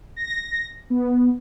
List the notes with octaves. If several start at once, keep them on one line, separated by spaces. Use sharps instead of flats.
A#6
B3